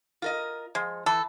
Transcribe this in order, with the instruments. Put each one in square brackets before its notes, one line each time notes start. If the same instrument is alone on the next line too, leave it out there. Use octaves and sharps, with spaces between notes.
[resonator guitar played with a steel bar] F4 A#4 D#5
[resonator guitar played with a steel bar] F3 [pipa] G#3
[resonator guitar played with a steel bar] E3 [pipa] A4